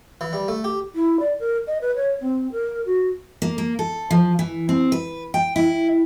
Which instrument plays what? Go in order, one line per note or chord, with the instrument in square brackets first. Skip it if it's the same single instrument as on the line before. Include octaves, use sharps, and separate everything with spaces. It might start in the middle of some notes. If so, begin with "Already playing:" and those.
[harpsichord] E3
G3
A3
G4
[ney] E4
D5
A#4
D#5
B4
C#5
C4
A#4
F#4
[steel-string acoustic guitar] A#3
A#3
A4
F3
E3
C4
B4
G5
E4